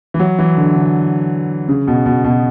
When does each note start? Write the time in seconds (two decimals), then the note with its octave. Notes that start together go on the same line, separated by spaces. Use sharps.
0.14 E3
0.20 F#3
0.39 E3
0.57 D3
0.76 D3
1.68 C#3
1.87 B2
2.06 B2
2.24 B2